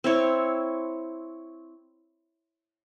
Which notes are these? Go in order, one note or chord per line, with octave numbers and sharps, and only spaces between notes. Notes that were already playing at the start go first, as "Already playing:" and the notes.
C4 E4 C#5